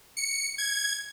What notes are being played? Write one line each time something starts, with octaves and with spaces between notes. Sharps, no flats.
C#7
G#6